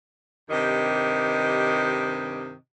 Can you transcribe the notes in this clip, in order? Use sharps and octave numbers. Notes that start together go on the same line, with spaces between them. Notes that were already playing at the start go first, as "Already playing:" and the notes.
G2 C3 D#3 G4 D#5